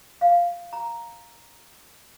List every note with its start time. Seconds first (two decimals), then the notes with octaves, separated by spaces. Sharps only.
0.21 F5
0.73 A#5